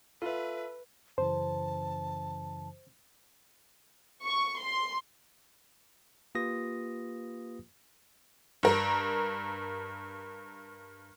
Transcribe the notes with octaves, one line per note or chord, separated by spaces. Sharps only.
F4 A4 B4 E5
F#2 C#3 E3 C5 A5
C#6
C6
A#3 F4 G4 B4 D#6 A#6
G2 A#4